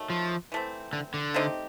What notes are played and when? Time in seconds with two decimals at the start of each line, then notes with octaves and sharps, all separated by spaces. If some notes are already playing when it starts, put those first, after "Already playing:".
Already playing: D#3 F#3 A3
0.10 F3
0.52 E3 A3 C4
0.93 D3
1.14 D3
1.34 A3 C4 D#4 G4